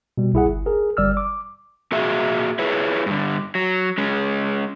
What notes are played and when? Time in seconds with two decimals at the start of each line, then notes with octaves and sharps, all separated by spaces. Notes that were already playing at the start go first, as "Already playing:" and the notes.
0.18 B2 G3
0.33 C2 E4 G#4 F#5
0.46 G1
0.66 G#4 A#4
0.97 G1 G3 D5 E6 F6
1.17 D6
1.92 A#2 F#4 G#4 E5
2.59 E4 G#4 B4 C#5
3.06 G2 D3
3.55 F#3
3.98 G#3 C#4